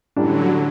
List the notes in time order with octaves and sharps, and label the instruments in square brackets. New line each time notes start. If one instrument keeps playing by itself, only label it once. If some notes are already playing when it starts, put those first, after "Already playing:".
[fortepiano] A1 A2 G3 D4 [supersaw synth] D3 F#3